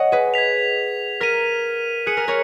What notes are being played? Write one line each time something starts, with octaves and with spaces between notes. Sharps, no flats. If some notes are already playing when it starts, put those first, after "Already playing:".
Already playing: C#5 D#5 F#5
G#4 B4
G#6 B6 F7
A#4 F6 B6 D#7
G#4 F#6 C#7 F#7
A#4
A#4 C#5